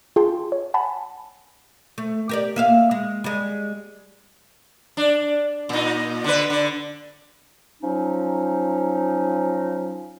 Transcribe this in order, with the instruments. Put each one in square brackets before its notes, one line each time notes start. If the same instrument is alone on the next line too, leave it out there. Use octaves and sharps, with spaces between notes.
[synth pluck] F4 G#4 G5 A5 C6
C#5
F#5 G#5 A5 B5
[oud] A3
G4 A#4 D5
A#3 E5 F5
G#3
G3 G#3
[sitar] D4
A#2 D#4
D3 B4
D3
[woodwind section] F3 F#3 C#4 D#4